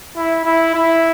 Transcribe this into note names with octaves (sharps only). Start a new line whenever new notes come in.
E4
E4
E4